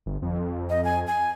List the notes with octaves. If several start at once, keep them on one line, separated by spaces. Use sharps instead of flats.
G1
F2
D#5
G#5
G#5